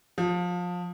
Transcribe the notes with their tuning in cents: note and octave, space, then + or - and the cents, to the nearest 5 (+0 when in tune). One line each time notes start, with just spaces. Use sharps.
F3 +25